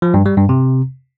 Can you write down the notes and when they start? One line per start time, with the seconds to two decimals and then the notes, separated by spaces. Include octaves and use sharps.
0.02 F3
0.14 G2
0.26 G3
0.37 G2
0.49 C3